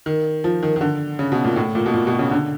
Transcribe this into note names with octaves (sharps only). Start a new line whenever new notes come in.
D#3
F3
D#3
D#3
D3
C#3
B2
A#2
A2
A#2
B2
A#2
B2
C#3
D3